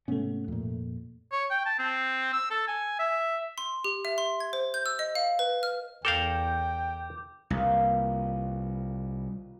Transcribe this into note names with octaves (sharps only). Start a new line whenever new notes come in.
G#2 C3 A3 B3 C#4
F2 A#2
C#5
G5
A5
C4
E6
A4
G#5
E5
C6
G4
E5
C6
G#6
C5
G6
E6
D#5
F5
B4
F6
E2 A4 A#4 F5 G5 D6 G6
C2 A#2 D#3 B4